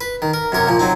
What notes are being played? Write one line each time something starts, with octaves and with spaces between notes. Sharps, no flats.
B4
D#3
A#4
F#2 C3 A#4 C#5
A#2 F3
F#3 C4 D#4